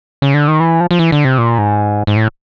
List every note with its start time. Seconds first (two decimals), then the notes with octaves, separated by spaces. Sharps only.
0.22 C#3
0.34 D3
0.48 D#3
0.60 E3
0.80 F3
0.91 F3
0.99 E3
1.12 D3
1.25 C3
1.38 A#2
1.58 G#2
2.07 G#2
2.16 A2